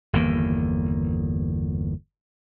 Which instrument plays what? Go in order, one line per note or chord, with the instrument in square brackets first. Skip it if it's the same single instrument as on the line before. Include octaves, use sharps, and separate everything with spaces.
[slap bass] G1 E2 D#3 A#3